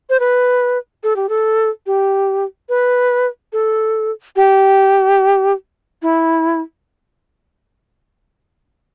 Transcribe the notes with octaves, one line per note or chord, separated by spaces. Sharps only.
C5
B4
A4
G4
A4
G4
B4
A4
G4
E4